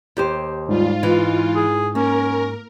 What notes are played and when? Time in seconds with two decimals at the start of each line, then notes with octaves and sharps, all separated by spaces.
0.17 D#2 G4 C5
0.69 G#2 G3 F4
1.03 E3 G#3
1.56 G#4
1.95 A#3 C#4 A#4